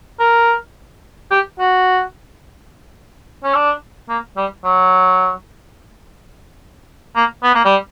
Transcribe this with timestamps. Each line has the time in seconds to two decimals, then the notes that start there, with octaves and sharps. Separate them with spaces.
0.20 A#4
1.31 G4
1.59 F#4
3.44 C#4
3.54 D4
4.09 A#3
4.37 G3
4.64 F#3
7.16 A#3
7.43 B3
7.55 A#3
7.65 G3